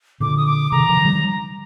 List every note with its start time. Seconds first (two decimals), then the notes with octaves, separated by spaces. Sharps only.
0.20 A#2 D3 D6
0.37 D#6
0.46 D6
0.72 C3 D#3 A#5
0.89 D3 F3
1.05 D#3 G3